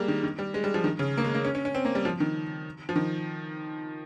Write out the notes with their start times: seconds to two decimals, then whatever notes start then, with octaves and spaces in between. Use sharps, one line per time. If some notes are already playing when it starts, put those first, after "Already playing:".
Already playing: G3 G#3 A#3
0.08 D#3
0.23 D#3
0.39 G3
0.54 G#3
0.64 G3
0.74 F3
0.84 D#3
0.99 C#3
1.17 A#3
1.24 G#3
1.34 A#3
1.45 C#4
1.55 C#4
1.65 C#4
1.75 C4
1.85 A#3
1.95 G3
2.05 F3
2.20 D#3
2.89 F3
2.96 D#3